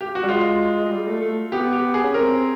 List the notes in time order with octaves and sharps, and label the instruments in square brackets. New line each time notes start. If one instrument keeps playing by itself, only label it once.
[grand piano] G4
F#4
[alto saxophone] G3
[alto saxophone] G#3 [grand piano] F4
[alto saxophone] G#3
G3
A3
A3
[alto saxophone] B3 [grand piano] G4
[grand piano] G4
G#4
[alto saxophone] C#4
[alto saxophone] C4 [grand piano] A#4